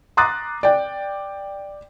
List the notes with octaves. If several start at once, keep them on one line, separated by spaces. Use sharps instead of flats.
A#5 C6 D6 D#6 F#6 A6
D5 G5